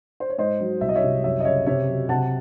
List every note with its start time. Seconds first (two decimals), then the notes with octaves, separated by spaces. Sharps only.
0.20 C5
0.30 C#5
0.38 G#2 C5 D#5
0.60 F#3
0.81 C2 E5
0.89 D#5
0.95 C#5 E5
1.03 C3
1.23 F#2 C#5 E5
1.40 D#5
1.45 C#3 C#5 E5
1.66 C3 C#5 E5
1.88 F#3
2.09 C3 F#5 A5